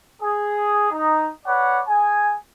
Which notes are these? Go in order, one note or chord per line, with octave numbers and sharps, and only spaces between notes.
G#4
D#4
B4 C#5 D5 F#5
G#4 G#5